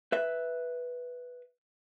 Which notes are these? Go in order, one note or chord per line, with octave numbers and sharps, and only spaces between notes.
B4 E5